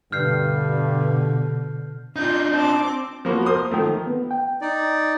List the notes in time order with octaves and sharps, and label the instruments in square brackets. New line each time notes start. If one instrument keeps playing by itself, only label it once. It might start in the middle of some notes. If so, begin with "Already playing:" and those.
[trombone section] G2 [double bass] B2 D3 [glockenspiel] F6 G6 C7
[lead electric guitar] D4 D#4 [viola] F4 [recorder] G6
[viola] C4 D6 [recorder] A5
[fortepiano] F3 A#3 B3 F#4
A#4 C5 D#6
D#3 F3 A3
[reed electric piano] B3
G5
[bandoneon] D#4 D5